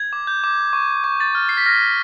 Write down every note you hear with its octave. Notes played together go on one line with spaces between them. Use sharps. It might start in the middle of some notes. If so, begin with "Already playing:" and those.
Already playing: G#6
D6
G6
D6
C#6
C#6
A6
F6
C7
B6
F6 A#6